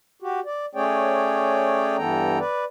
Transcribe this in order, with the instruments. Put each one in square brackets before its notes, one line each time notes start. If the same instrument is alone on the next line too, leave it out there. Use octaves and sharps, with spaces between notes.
[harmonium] F#4 G4
D5
A3 C#4 G#4 C#5 D5 G5
G2 E3 B3 A4 G5 A#5
B4 D5